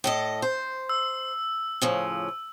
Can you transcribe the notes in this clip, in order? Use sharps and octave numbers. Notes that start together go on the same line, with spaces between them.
A2 A4 D#5
C5
E6
A2 C#3 F3